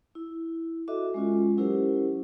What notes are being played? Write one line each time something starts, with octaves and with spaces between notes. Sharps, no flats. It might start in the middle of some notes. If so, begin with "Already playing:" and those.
E4
F#4 A4 D#5 E5 D6
G#3 C#4 F4
F#3 C#4 E4 G4 A#4 C5